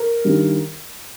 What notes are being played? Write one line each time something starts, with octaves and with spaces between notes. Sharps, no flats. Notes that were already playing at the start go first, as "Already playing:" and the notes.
Already playing: A#4
G2 D#3 G3